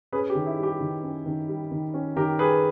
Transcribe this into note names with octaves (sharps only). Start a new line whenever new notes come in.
C#4 G#4 B4
G4
D#3
E4
G3
G4
D#3
C#4
D#3
G3
D#3
C#4
D#3 G4 A#4
G3 G#4 B4